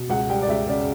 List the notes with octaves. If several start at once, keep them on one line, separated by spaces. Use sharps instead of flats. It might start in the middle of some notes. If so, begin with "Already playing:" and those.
Already playing: B2
C#2 F#5
G3 G5
D5
C#2 E5
C#3 D5